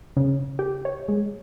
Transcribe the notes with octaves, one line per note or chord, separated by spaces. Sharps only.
C#3
G4
C#5
G#3